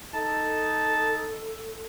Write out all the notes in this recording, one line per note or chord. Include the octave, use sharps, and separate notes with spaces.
D#4 A4 A5